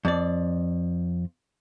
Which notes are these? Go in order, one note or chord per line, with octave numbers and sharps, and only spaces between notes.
F2 D5